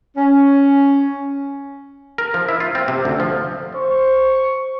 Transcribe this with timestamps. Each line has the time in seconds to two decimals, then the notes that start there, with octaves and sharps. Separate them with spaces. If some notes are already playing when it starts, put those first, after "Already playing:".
0.16 C#4
2.18 A#4
2.34 F3
2.49 E4
2.60 F4
2.75 C4
2.88 C3
3.05 D2
3.20 F3
3.75 C5 C#6